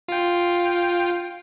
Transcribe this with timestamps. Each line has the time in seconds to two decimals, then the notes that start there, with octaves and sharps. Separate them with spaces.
0.08 F4 G5